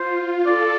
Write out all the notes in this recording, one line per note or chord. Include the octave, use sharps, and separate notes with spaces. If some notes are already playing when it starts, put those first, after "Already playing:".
Already playing: F4 C5
A4 D5